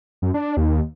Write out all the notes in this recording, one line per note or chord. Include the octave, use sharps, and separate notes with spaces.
F#2
D4
D#2